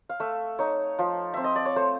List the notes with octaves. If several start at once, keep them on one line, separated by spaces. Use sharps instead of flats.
F5
A3 E5
D#4 C#5
F3
C4 E5
D#5
D5
C#5
A3 C5